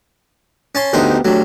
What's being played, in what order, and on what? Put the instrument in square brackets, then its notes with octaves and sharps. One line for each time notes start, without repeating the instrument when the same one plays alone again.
[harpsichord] C#4 A5 C6
[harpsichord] D2 D#4 C5 [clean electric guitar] B3 G4
[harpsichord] F#3 [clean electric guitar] A3 D4 G4